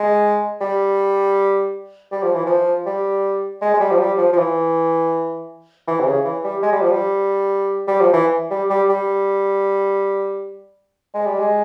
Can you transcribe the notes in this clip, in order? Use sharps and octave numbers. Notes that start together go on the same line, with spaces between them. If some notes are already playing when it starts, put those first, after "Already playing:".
Already playing: G#3
G3
G3
F3
E3
F3
G3
G#3
G#3
G3
F3
G3
F3
F3
E3
E3
C3
C#3
E3
G3
G#3
G3
F3
G3
G3
F3
E3
G3
G3
G3
G#3
G3
G#3